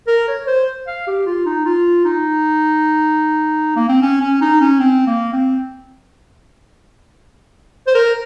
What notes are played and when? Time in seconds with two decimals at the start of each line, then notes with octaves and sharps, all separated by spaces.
0.07 A#4
0.28 C#5
0.47 C5
0.87 F5
1.07 G4
1.26 F4
1.46 D#4
1.65 F4
2.05 D#4
3.76 A#3
3.89 C4
4.02 C#4
4.21 C#4
4.41 D#4
4.61 C#4
4.80 C4
5.07 A#3
5.33 C4
7.87 C5
7.95 A#4